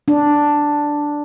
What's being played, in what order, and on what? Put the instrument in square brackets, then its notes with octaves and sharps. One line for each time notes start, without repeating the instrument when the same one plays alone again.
[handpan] D4